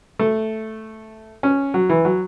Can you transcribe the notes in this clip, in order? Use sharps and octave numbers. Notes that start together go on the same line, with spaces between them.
A3
C#4
F#3
E3
F#3